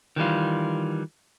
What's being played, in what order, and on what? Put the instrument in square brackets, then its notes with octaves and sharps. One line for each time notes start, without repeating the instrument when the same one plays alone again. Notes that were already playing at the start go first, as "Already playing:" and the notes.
[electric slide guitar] D#3 E3 G3 F4